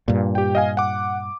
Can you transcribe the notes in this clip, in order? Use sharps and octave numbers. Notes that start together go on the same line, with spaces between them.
G2 A#2
G4 G5
D#5 F5 G#5
F#5 D6